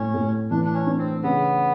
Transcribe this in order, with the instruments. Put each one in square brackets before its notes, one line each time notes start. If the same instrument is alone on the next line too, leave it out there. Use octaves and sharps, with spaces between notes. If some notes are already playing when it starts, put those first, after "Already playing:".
Already playing: [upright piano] A2 [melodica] C#4
[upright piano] A2
[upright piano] E3 [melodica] D4
[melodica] D4
C#4
[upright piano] D4
[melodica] C4
[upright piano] C#3 [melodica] B3